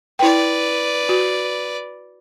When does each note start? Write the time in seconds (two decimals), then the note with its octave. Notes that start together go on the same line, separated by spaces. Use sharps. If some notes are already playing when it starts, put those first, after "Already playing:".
0.19 E4 B4 D5 G5
1.09 F#4